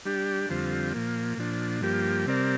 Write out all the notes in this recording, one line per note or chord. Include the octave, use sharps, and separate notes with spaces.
G3 D4 G4
F2 D3 G3 C4 F4
A#2 F3 A#3
A#2 F3 D4
G2 F3 A#3 G4
C3 G3 C4 A#4 D5